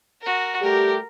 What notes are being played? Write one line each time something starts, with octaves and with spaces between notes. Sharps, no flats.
F#4 A#4
G3 A3 G4 A#4